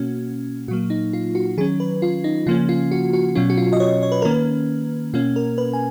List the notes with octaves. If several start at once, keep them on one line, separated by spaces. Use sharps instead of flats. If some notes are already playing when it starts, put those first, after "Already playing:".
Already playing: B2 A#3 C#4 F#4
A#2 F#3 A#3 F#4
D#4
F4
F#4
D#3 F#3 C#4 G#4
B4
F4
D#4
C#3 F3 A#3 C#4 F4
F4
F#4
F#4
B2 F#3 C#4 F4
F#4
F4
D#5
C#5
C#5
B4
D#3 A#3 C#4 A#4
B4
B2 A#3 C#4 F4
A#4
B4
G#5